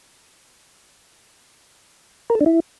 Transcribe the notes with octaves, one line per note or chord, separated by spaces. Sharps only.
A#4
A4
D4
E4